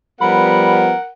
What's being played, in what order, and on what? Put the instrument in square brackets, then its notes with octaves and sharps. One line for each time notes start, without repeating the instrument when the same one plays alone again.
[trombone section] F3 G3 B3 [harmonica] A#4 F#5 [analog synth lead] B5